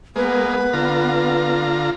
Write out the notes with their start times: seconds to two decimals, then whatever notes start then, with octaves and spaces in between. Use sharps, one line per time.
0.16 G#3 A#3 B3 B4
0.73 D3 F4 A#5